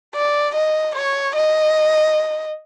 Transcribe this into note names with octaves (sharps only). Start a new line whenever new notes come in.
D5
D#5
C#5
D#5